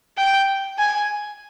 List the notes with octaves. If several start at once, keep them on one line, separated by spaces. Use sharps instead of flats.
G5
G#5